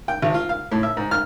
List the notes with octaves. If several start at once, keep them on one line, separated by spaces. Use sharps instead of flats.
G5
G#1
F4
F5
A2
E5
G#2
F6